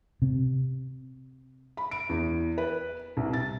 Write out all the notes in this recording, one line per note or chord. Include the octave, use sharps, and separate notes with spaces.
C3
B5
D7
E2
B4
C2
A6